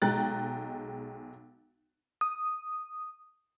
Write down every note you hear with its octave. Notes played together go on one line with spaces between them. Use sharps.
B1 G#3 G5 A#5 F#6 A6
D#6